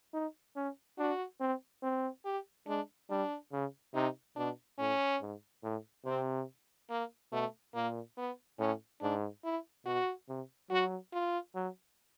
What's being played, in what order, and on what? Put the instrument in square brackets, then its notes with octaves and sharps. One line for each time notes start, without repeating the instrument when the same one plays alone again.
[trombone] D#4
C#4
[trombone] D4 [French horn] F#4
[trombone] C4
C4
[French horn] G4
[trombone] G#3 [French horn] D4
[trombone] G3 [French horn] D4
[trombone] C#3
[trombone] C3 [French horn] D#4
[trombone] B2 [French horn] D4
[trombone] A2 [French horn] C#4
[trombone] G#2
A2
[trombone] C3 [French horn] C4
[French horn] A#3
[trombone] B2 [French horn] A3
[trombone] A#2 [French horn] A#3
[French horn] B3
[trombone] A2 [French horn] C#4
[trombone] G#2 [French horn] D4
[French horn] E4
[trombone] B2 [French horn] F#4
[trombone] C3
[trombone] F#3 [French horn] F#4
[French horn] F4
[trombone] F#3